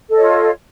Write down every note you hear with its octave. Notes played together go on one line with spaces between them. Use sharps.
F4 A4 C#5 D#5